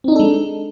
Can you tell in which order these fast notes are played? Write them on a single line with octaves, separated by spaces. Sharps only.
C4 D#4 D4 A4 G#3